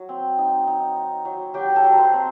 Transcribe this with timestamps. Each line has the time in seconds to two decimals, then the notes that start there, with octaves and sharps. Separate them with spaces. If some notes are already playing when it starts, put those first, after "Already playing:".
Already playing: F#3
0.09 C4
0.38 D#4
0.67 D#4
0.96 D#4
1.25 F#3
1.54 F#3 G4 G5
1.70 A#5
1.76 A4 A5
1.83 F#3
1.92 A#5
1.98 C5 C6
2.13 C4